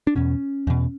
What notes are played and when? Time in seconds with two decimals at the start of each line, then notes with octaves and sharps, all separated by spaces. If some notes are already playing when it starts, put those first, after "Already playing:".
0.07 D4
0.15 E2 B2 C#4
0.67 E2 B2